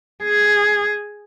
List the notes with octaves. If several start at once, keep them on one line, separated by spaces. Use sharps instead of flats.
G#4